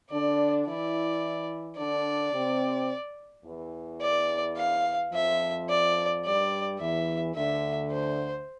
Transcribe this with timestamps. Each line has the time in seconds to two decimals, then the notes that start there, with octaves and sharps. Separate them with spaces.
0.11 D3 D4 D5
0.67 E3 E4 D5
1.78 D3 D4 D5
2.34 C3 C4
3.45 E2 E3
4.01 D5
4.57 F5
5.13 F2 F3 E5
5.69 D5
6.24 G2 G3 D5
6.80 E2 E3 E5
7.35 D2 D3 E5
7.91 C5